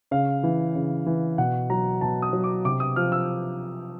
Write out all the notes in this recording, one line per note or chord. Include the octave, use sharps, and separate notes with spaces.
C#3 F5
E3
C#3
E3
B2 F#5
F#3 A#5
B2 A5
D#6
F#3
D6
C3 D6
D#6
F3 F6
E6